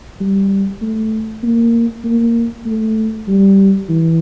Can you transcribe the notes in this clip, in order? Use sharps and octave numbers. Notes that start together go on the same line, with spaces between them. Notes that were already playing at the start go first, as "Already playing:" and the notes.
G3
A3
A#3
A#3
A3
G3
E3